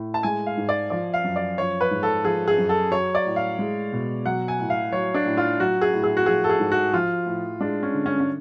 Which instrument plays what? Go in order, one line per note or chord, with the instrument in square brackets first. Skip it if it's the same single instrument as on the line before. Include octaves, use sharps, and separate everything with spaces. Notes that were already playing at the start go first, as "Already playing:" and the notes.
Already playing: [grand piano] A2
[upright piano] A5
[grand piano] G#3 [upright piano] G#5
[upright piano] F5
[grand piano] G#2
[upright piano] D5
[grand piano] F3 [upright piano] D5
[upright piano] F5
[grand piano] F#2
[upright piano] D5
[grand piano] F3 [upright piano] C#5
[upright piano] B4
[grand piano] G#2
[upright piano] A4
[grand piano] F3 [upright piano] G#4
[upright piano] G#4
[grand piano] F#2
[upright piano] A4
[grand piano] F#3 [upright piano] C#5
[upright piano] D5
[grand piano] A2
[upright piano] F5
[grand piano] G#3
B2
[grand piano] F#3 [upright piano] F#5
[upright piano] G#5
[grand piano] A2
[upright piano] F5
[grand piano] F#3 [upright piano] C#5
[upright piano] D4
[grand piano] A2
[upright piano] F4
[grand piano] F#3 [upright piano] F#4
[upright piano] G#4
[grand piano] A2
[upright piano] G#4
F#4
[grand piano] F3 [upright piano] G#4
[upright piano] A4
G#4
[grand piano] G#2
[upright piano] F#4
[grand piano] F3 [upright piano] F4
[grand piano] A2
[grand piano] G#3 [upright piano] D4
[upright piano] C#4
[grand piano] D3
[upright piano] C#4
C#4